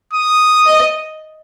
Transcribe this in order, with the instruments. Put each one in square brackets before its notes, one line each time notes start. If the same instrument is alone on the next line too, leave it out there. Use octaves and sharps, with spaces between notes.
[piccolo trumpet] D#6
[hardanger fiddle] D#5